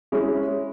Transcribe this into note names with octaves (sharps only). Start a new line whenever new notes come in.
G#3 C#4 E4